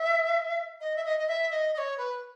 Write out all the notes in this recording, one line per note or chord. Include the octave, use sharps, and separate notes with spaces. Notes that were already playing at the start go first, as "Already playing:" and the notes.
Already playing: E5
D#5
E5
D#5
D#5
E5
D#5
D#5
C#5
B4